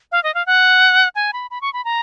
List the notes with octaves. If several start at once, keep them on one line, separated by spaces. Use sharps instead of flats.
F5
D#5
F5
F#5
G#5
B5
B5
C#6
B5
A#5